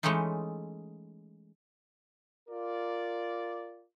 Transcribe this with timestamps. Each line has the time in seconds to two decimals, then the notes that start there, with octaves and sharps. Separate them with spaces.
0.03 E3 G#3 A3 C#4 D#4 F4
2.49 F4 A#4 D5